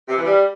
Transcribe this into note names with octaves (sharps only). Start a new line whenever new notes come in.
C3
E3
G3